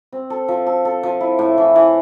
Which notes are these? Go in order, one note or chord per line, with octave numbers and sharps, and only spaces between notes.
C4
A4
F3
A4
A4
F3
E4
A2
E3
E3